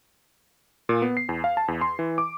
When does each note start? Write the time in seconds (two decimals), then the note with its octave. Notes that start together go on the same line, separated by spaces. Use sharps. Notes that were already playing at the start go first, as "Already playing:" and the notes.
0.89 A#2
1.02 B3
1.17 C7
1.29 E2
1.44 F5
1.57 A5
1.68 E2
1.81 C6
1.99 E3
2.18 D6